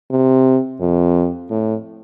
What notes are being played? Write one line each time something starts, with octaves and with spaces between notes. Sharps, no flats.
C3
F2
A2